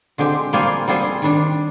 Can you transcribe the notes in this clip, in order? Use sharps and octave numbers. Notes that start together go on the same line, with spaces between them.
D3 G#3 C4 G4
G3 A#3 F4 G#4 C5
G3 C4 F4 G#4 C5
D#3 G3 D4